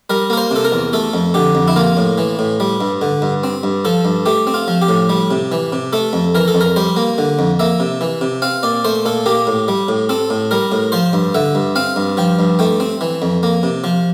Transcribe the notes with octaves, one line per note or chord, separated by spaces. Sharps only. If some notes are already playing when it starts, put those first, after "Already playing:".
G3 A#4
A#3 A#4
C5
C3 A4
A#4
E2
A3 A4
F2
D3 G4
F2
E4
A#3 F4
A2
E3
A2
G3
G2
D3
G2
C4
G2
F3 A4
G2
A3 G4
C4
F4
F3
G4
A2
G3
C3
E3
C3
A3 A4
F2
E3 A#4
A4
F2
A#4
G3 C5
A#3
D3
F2
A#3 E5
C3
E3
C3
C4 F5
A#2 D5
A3 C5
A#2 A4
A#3 G4
A2
G3
A2
C4 A4
A2
G3 A#4
A2
F3 C5
G2
D3 E5
G2
C4 F5
G2
F3 G5
G2
A3 G5
C4
E3
F2
A#3
C3
F3